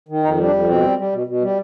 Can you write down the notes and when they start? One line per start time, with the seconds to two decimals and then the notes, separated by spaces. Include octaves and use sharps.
0.09 D#3
0.23 F2 D#4
0.38 G3
0.45 D4
0.53 F2
0.68 B2 C4
0.82 G3
0.97 G3
1.12 B2
1.27 B2
1.42 G3